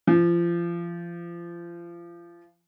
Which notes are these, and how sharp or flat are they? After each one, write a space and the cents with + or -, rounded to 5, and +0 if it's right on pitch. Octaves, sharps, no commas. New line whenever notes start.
F3 -30